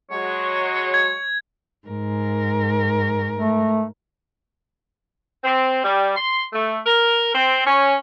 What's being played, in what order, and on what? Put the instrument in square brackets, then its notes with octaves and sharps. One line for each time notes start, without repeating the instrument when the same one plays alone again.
[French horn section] F#3 G#3 F#4 [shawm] C#5
[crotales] G#6
[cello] G#2 A#4
[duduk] A3
[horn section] C4
G3
C6
A3
A#4
C4
C#4